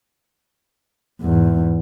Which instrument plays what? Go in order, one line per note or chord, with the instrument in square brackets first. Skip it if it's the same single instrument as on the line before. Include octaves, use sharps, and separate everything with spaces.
[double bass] E2 G#2